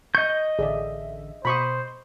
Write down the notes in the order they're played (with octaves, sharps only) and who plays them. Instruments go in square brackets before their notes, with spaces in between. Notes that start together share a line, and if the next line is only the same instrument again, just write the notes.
[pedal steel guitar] D#5 G6 [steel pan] C#6
[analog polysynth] A1 D3 E5 [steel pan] G#4 D5
[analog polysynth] B2 [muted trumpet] C5 [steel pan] B5 C#6 D#6